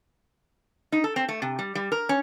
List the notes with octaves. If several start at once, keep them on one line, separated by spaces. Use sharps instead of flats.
D#4
A4
C4
A3
C3
G3
G3
A#4
C#4